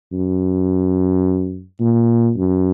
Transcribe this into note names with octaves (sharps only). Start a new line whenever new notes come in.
F#2
A#2
F#2